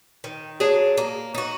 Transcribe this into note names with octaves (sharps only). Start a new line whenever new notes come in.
D#3
F#3 D4 G#4
A#3
D#4 F#4